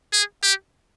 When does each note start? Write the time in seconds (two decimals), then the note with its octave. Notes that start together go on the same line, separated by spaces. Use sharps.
0.13 G#4
0.43 G4